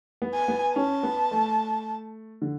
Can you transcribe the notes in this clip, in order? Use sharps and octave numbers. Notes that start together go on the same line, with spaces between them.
B3
G#5
B3
C#4 A5
B3
A3
D3